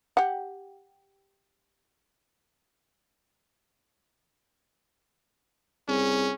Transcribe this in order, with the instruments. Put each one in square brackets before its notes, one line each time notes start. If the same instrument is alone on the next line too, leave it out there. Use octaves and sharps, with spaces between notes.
[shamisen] G4 F#5
[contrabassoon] C2 [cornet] C#4 [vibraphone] G#4